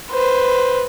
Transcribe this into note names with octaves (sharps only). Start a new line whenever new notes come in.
B4 C5